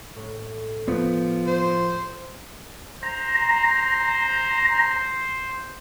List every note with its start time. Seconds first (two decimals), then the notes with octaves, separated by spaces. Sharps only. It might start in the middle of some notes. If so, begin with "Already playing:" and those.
0.16 A2
0.88 F3 B3
1.47 C5
3.03 C5 A#5